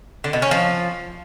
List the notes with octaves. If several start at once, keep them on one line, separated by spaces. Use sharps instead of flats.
D3
B2
C#4
F3